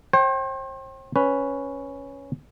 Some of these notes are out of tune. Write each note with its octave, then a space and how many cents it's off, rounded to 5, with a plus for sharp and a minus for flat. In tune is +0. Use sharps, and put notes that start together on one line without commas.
C5 +40 G5 -10
C#4 +0 B4 +0